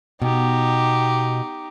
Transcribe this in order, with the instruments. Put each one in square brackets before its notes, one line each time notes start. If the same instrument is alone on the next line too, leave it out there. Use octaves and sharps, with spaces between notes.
[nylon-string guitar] B2 [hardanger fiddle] D#4 G4